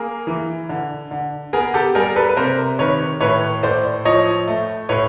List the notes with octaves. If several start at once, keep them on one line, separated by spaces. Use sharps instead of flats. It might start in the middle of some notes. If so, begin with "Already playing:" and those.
Already playing: A#3 G#4 A#4
E3
D3
D3
B3 G#4 A#4
G4 A4
G3 G#4 A#4
A4 B4
B4
C3 A#4 C5
D#3 B4 C#5
A2 B4 C#5
A2 C5 D5
F3 C#5 D#5
A3
A2 B4 C#5